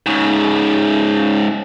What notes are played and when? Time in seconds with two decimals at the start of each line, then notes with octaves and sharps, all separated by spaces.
0.06 G#2 C#3